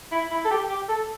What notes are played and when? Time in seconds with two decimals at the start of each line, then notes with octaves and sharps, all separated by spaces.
0.12 E4
0.31 E4
0.45 A4
0.50 G4
0.69 G4
0.89 A4